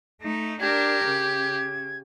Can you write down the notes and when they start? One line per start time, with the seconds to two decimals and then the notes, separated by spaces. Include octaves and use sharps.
0.22 A3 D#4
0.61 D4 G4 A#4 G#6
1.06 C#3